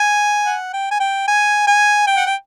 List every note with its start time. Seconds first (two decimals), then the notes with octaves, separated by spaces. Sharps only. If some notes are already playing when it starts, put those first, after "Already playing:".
Already playing: G#5
0.46 F#5
0.73 G5
0.91 G#5
1.00 G5
1.28 G#5
1.67 G#5
2.07 G5
2.17 F#5
2.26 G5